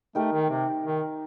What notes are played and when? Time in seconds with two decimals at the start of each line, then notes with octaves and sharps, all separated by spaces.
0.15 A3 D#4 G4 A#4
0.33 D#3
0.50 C3
0.85 D#3